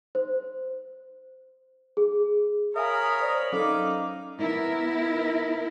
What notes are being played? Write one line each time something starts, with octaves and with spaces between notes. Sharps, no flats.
C5
G#4
A#4 C#5 E5 F5 G#5 B5 D#6
C5 D5 F7
F#3 C#4 D#4 A4 F5 D6
B3 E4 A#4